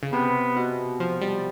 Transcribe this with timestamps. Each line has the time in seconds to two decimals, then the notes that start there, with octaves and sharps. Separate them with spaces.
0.03 C#3
0.12 C3 B3
0.57 B2
1.00 F3
1.21 G3